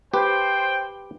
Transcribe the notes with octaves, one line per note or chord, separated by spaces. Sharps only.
G4 B4 C5 G5